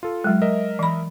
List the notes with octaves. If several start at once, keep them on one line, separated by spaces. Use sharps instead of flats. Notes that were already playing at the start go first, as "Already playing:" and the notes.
F4 A4
F#3 G#3
A#4 D#5 E5
E3 B5